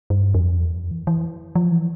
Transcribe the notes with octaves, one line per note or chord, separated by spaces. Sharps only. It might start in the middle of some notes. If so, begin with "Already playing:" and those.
G2
F2
E2
F2
E3
E3
F3
E3